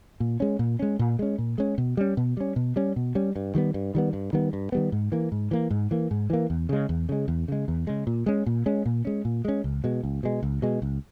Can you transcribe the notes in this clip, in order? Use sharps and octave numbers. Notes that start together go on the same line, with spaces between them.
A#2
G#3 C#4
A#2
G#3 C#4
A#2
G#3 C#4
A#2
G#3 C#4
B2
G3 C#4
B2
G3 C#4
B2
G3 C#4
B2
G3 C#4
G2
D#3 G3 B3
G2
D#3 G3 B3
G2
D#3 G3 B3
G2
D#3 G3 B3
G#2
E3 A#3
G#2
E3 A#3
G#2
E3 A#3
G#2
E3 A#3
E2
C#3 G#3
E2
C#3 G#3
E2
C#3 G#3
E2
C#3 G#3
A#2
G#3 C#4
A#2
G#3 C#4
A#2
G#3 C#4
A#2
G#3 C#4
C#2
B2 G#3
C#2
B2 G#3
C#2
B2 G#3
C#2